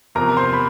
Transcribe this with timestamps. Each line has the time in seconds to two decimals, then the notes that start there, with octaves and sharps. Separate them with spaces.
0.15 E2 C3 F3 A#4 A#5
0.37 C5 C6
0.53 B5